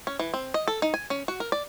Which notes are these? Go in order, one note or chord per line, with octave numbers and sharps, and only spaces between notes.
C#4
E3
C4
D#5
A4
D#4
G#5
C#4
F#4
A#4
D5